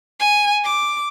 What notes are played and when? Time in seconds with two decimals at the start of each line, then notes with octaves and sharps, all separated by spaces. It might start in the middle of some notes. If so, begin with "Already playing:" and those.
0.20 G#5
0.64 D6